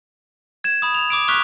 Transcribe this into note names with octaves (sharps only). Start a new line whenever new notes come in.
G#6 E7
B5 D#6
F7
D6 D#6 D7
C#6 D6 F6 F#6 B6 F7